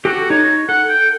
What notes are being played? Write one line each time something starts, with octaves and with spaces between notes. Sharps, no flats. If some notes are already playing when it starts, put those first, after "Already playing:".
F#4 G4 A4
D#4 C#5
A4 F#5
G5